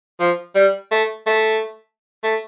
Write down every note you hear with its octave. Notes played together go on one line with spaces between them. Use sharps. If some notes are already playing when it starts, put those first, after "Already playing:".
F3
G3
A3
A3
A3